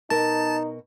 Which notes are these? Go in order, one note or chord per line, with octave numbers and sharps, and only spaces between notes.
B2 D#4 A#4 A5